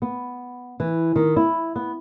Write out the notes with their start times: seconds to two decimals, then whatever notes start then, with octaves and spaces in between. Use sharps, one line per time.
0.02 B3
0.80 E3
1.16 D#3
1.36 E4
1.76 B3